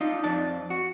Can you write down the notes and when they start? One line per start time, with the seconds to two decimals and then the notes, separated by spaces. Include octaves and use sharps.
0.01 D4 D#4 F4
0.24 F2 D5 A5
0.70 F#4